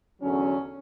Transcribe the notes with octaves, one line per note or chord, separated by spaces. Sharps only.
E2 D3 F#3 C#4